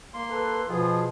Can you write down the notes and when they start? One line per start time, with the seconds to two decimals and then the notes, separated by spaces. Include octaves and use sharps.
0.14 A#3 C6
0.29 A4 B4
0.69 B2 F3 F4 G#4